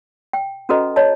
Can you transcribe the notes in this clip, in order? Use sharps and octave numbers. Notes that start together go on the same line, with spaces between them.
G5
C#4 F#4 A4 B4 D#5 A#5
C#5 D#5 A5